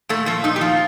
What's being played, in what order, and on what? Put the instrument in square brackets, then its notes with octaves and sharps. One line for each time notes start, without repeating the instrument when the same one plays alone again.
[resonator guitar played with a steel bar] A#2 A3
F3 A3
A#2 D#4
G4
F3 F4